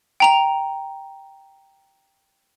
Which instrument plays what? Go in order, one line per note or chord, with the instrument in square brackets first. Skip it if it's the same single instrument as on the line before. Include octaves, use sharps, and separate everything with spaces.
[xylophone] G5 A#5 F7